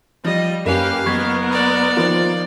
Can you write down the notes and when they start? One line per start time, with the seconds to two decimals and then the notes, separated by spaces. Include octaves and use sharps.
0.25 F3 G3 D#5
0.66 F#2 A#3 C#4 G4 B4 F5
1.06 F#1 B3 A#4 C#6 G#6 B6
1.52 D5
1.97 D#3 F3 A#3 F4 C5